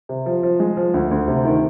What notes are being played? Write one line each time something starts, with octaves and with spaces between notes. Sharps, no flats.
C3
F3
F3
G#3
F3
D2
D2
C3
D#3